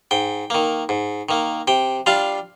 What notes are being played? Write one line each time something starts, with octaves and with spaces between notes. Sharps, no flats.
G#2 G5
D#3 A#3
G#2
D#3 A#3
C3 G5
G3 D4 F4 F5